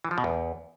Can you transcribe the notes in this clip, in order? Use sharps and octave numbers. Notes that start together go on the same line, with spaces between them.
E3
F3
B2
E2